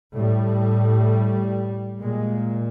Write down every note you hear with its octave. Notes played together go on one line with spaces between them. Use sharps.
A2 G3
A#2 G#3